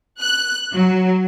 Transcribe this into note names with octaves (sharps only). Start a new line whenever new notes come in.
F#6
F#3